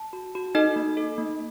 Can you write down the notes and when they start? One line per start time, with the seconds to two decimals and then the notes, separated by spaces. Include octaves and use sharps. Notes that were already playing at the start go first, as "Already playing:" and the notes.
Already playing: A5
0.13 F#4
0.35 F#4
0.55 D#4 A4 D#5
0.76 A#3
0.97 A4
1.18 A#3